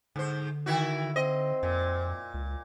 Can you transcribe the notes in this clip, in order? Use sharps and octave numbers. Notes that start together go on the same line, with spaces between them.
G#2 D3 C5
D#3 E4 F#4
C4 D#5
F2 A#2
C#2